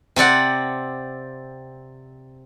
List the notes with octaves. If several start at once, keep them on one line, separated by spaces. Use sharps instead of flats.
C3 C4 D5 F#5